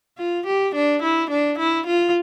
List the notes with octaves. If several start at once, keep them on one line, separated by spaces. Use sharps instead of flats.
F4
G4
D4
E4
D4
E4
F4